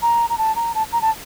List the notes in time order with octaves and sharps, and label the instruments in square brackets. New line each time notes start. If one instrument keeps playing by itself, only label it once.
[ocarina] A#5
A#5
A5
A#5
A5
A#5
A5